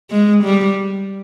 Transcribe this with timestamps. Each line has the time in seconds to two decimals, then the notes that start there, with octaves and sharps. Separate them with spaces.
0.11 G#3
0.43 G3